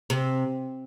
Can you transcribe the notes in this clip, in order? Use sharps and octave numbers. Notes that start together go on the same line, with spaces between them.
C3